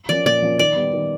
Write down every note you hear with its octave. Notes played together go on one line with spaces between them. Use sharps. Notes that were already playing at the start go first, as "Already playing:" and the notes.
F3 A#3 C#4 D5
A#2 D5
F3 A#3 C#4
D#3 D5
G3 B3
D#3